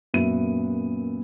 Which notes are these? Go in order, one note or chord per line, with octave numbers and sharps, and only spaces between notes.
F#2 A#2 F#3 B3 E5 D#7